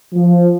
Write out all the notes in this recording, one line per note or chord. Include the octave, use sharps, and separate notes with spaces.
F3